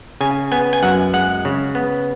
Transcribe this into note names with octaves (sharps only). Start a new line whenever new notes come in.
C#3 G#5
B3 G#5
G#5
F#2 F#5
G#3 F#5
C#3
B3